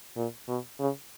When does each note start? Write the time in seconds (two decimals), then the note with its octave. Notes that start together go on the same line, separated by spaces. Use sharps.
0.16 A#2
0.48 B2
0.80 C#3